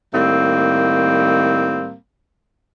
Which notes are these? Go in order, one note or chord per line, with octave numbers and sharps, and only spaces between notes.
A2 D#3 G3 A#3 C4